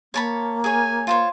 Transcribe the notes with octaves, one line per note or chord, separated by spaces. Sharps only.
A#3 C#5 A5 B5
G#4 C#5 G#5
F4 C5 C#5